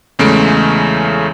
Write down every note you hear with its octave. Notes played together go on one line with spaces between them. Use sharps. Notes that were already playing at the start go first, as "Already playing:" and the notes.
E2 C#3 G#3 A3 D7